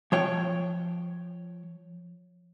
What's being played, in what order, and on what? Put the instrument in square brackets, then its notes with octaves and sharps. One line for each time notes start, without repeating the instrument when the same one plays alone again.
[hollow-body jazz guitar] F3 C#5 G5